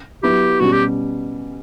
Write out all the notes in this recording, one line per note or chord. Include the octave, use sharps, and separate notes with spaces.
F#3 B3 E4 G4
B2 G3 C#4 F#4
G4